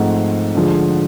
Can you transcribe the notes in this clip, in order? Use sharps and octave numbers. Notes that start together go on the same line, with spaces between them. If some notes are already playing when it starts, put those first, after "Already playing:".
Already playing: G#2 F3 A3 C4 F#5
D3 F3 G#3